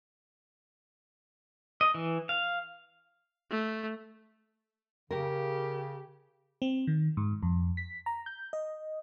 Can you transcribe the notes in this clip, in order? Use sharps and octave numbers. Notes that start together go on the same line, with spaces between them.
D#5
E3
F5
A3
C#3 G4 A#4
C4
D#3
G#2
F2
B6
A#5
G6
D#5